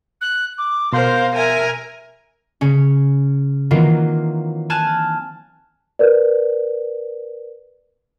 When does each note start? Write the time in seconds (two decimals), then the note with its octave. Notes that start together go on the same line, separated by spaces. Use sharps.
0.21 F#6
0.58 D6
0.93 B2 A#4 C5 F5 C6 G6
1.35 A#4 E5 G#5
2.61 C#3 C#4
3.71 D#3 E3 F#3 A#3 C4 F4
4.70 G#5 A5 F6 F#6 G#6 E7
5.99 A#4 B4 D5